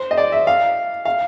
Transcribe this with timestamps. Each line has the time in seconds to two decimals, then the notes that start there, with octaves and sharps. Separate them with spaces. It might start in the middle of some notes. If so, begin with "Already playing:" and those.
Already playing: C5
0.11 D#5
0.18 D5
0.32 E5
0.47 F5
1.05 F5